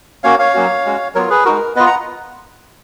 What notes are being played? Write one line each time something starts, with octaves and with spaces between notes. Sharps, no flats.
A#3 C#4 F#4 C#5 F5
C#5 F5
F#3 A#3 C#4 F#4
G#3 C#4 F#4
F#3 B3 F4 A#4 C#5
G#4 B4
G#3 D#4 F#4 A#4
B3 F4 B4 D#5
F#5 A#5